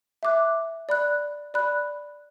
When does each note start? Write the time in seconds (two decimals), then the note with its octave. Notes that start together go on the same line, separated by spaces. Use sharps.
0.23 E5 D6 F#6
0.89 D5 B5 F#6
1.54 D5 B5 F#6